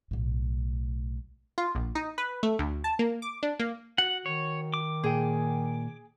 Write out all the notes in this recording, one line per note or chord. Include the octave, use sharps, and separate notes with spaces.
B1 A2
F4
A#1
D#4
B4
A3
D2
A5
A#3
D6
D4
A#3
F#4 F#5
D#3 C#5
D6
A#2 G#4 G5